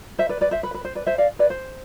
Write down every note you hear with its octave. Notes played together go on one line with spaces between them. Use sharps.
C5 E5
B4 D5
B4 D5
C5 E5
B4
B4
C5
B4 D5
C5 E5
D5 F5
B4 D5
C5